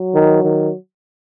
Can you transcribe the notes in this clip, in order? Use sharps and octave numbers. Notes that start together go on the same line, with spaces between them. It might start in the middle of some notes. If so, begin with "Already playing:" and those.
Already playing: F#3
D#3
D#3